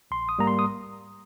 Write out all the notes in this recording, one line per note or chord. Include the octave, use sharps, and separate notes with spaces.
A#1 C6
D#6
G#2 G3 A#3 A#5
C6
D#6